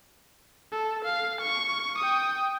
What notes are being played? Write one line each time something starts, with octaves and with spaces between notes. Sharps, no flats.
A4
F5
C#6
G5 D#6